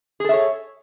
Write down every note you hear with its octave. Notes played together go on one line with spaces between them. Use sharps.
G#4 A4 C#5 E5